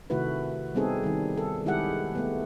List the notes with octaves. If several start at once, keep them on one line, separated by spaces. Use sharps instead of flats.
C3 D#3 A3 E4 F#4 B4
G3 B3 C4 D#4 G#4 A4
D#3 G3
A4
D#3 G#3 E4 G4 G#4 F#5
A3 B3